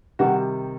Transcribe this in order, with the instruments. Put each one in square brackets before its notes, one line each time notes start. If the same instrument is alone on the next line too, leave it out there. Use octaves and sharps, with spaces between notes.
[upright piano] C3 D#3 G3 F#4